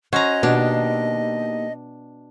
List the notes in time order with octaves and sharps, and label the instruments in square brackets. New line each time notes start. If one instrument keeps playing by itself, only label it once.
[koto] C#4 A#5 [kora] F#4 C5 [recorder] D#5
[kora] B2 [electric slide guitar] A#3 D#4 G4 [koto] D4